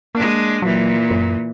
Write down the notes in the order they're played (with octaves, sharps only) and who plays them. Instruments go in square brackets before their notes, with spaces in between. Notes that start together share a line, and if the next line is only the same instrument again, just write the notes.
[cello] G#3 D4 [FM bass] A#3
[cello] A#2 E3 [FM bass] F#3
[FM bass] F#2